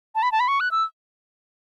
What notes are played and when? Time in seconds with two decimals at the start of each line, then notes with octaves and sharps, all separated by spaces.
0.15 A5
0.23 B5
0.32 A5
0.40 B5
0.48 C#6
0.60 F#6
0.71 E6